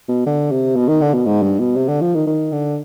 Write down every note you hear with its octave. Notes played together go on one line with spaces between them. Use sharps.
B2
D3
C3
B2
D#3
D3
B2
G#2
G2
B2
C3
D3
F3
D#3
D#3
D3